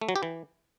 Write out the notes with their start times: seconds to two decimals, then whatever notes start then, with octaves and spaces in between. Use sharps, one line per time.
0.01 A3
0.09 F#3
0.16 G4
0.23 E3